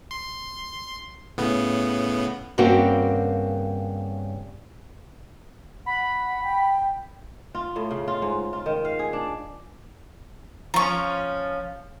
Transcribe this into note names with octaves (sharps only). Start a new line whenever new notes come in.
C6
A2 C#3 B3
G2 C#3 A#3 C4 F#4
F#5 B5
G5
F4
A2
C#3
F4
G#2
F4
D#3
F5
G#4
D4
F3 C#4 A#5 C#6